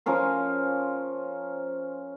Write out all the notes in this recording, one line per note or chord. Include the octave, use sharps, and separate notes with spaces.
F3 C#4 A#4 C6